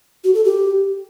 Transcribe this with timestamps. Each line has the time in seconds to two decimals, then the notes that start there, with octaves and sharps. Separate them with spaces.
0.24 F#4
0.34 A4
0.45 G4